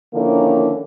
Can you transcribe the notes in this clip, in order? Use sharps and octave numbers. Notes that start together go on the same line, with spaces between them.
D3 D#3 F3 A#3 C#4 E4